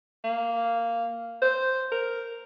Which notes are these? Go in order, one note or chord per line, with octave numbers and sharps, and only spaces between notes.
A#3
C5
A#4